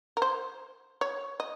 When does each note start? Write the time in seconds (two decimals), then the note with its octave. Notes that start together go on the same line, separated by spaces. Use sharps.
0.17 A#4
0.22 C5
1.01 C#5
1.40 D#5